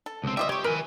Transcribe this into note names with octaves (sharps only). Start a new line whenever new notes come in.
A4
C#2 C4
G3 F4 D#5 E5
G4 C#5 C#6
A#4 B4 G#5